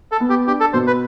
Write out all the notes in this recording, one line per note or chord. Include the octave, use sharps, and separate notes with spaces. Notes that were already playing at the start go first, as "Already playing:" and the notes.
A4
B3
G4
D4 G4
A4
B2 C5
B4